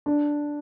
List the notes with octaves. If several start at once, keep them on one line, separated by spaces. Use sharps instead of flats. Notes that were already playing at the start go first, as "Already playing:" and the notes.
D4